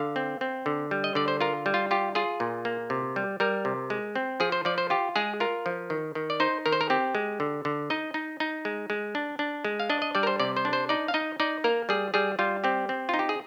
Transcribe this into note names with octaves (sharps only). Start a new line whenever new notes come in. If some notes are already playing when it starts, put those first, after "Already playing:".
Already playing: D3 F5
C4
C4
D3
G3
D#5
D3 D5
C5
F4 A#4
G3
F4
F4 G4
F4 G#4
A#2
A#3
C3
G3
G3 A#4
C3
G#3
C4
F3 G#4
C5
F3 D5
C5
F4 G4
G#3 G#4
F4 A#4
F3
D#3
D#3
D5
D#4 C5
D#3 A#4
C5
A#4
C4 G4
G#3
D3
D3
D#4 D#5
D#4
D#4
G#3
G#3
D4
D4
G#3
F5
D4 D#5
D#5
G3 D5
A#4
C5
C3 D5
C5
D4
C5
D#4 D5
F5
D#4 D#5
D#4 D5
A#3 A#4
G3 G#4
G3 G#4
G3 F4
C4 G4
C4
D#4 F4
G4
G#4